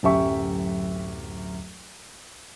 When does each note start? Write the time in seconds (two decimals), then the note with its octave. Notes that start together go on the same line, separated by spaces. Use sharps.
0.03 D1 F#2 G4 E5 C#6